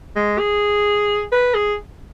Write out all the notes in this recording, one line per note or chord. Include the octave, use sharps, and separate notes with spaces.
G#3
G#4
B4
G#4